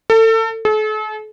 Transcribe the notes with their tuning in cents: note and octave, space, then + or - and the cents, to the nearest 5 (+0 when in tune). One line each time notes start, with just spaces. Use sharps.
A4 +30
A4 -40